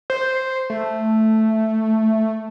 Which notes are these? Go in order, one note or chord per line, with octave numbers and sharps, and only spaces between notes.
C5
A3